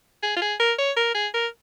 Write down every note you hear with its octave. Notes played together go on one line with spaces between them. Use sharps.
G#4
F4
G#4
A#4
C#5
A#4
G#4
A#4